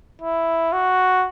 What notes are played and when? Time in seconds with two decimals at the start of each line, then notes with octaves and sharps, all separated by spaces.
0.21 E4
0.73 F#4